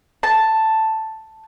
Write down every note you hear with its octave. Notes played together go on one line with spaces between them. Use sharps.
A5